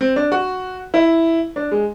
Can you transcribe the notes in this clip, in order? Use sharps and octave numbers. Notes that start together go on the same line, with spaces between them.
C4
D4
F#4
E4
D4
G#3